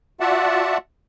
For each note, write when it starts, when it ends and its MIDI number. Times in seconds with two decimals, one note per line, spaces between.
0.20 0.78 65
0.20 0.78 66
0.20 0.78 74
0.20 0.78 76
0.20 0.78 78
0.20 0.78 81